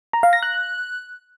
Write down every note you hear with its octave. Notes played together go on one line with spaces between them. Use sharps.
A#5
F5
A#6
F#6